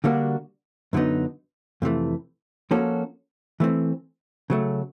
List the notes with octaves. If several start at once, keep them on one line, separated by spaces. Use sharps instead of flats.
D3 G3 A#3 D4 F#4
F#2 D3 F#3 B3 D#4
F2 C3 E3 A3
F3 A#3 C#4 F#4 A4
E3 A3 C4
C#3 F#3 A3